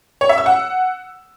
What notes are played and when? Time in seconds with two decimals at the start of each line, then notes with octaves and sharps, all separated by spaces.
0.21 C#5
0.29 E5
0.38 E6
0.46 F#5